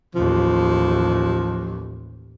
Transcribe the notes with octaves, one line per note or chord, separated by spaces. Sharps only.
A1 D#2 F3